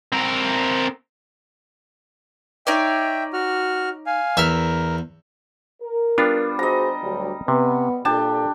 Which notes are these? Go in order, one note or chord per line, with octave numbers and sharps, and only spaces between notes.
C4 A#4
D#4 C#5 D5 E5 G5
F#4 F6
F5 G#5
E2 A#4 E5 F6
A#4
G3 B3 D4 F4
F#4 G#4 C5 D#5 A#5
D2 F#3 G3
C3 B3
A#2 D4 G4 A4 A5